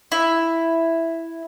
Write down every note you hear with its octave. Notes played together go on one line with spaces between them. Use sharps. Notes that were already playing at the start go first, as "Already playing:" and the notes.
E4